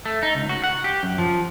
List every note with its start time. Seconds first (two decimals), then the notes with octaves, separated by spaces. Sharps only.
0.06 A3
0.23 D#4
0.35 C#2
0.49 F#4
0.64 F#5
0.84 G4
1.03 F#2
1.18 F3